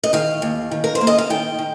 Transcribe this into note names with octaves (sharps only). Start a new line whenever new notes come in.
D#5
D#3 F5
D#2
D#3
A#4
C5
A#3
D#5
F5
D#3 G5
D#3